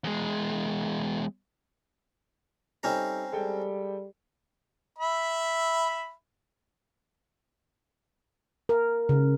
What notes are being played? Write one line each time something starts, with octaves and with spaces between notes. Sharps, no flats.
E2 G#3
G3 C4 C#4 D#4 A4 A#5
G3 G#3 A4 G5
E5 B5
A#4
C#3